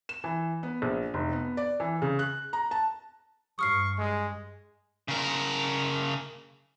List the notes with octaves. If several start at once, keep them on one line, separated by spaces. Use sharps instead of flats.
E7
E3
B3
A#1
F1
B3
D5
E3
C#3
F#6
A#5
A5
G2 C#6 D#6 F6 C7
G#3
C#3 A#4